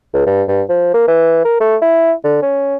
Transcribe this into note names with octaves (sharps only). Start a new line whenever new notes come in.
C#2
G2
G2
F3
A#3
E3
A#4
A3
E4
D3
C#4